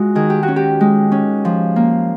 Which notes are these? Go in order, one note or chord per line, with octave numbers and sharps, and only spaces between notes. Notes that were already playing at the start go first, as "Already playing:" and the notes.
Already playing: G#3 F4 F#4
D#3 G#4
G4
F#4
C#4
G4
G#3
C#4
F3
A#3